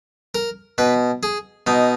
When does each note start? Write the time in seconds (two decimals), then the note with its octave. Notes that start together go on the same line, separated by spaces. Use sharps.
0.35 A#4
0.78 B2 B4
1.23 G#4
1.67 B2 D#4